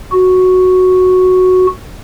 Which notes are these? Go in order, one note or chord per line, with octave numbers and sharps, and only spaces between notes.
F#4